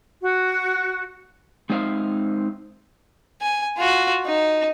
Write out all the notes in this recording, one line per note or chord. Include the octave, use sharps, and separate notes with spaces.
F#4
G#3 C4 D#4 C5 E5 F5
G#5
F4 F#4
D#4